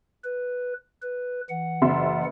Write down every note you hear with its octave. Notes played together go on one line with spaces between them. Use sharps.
B4
B4
E3 F#5
F#1 E5 C6